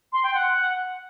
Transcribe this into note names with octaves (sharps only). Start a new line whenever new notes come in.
C6
G5
F#5